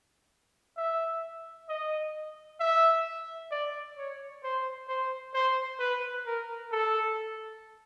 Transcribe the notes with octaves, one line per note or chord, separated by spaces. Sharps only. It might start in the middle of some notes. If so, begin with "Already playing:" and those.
E5
D#5
E5
D5
C#5
C5
C5
C5
B4
A#4
A4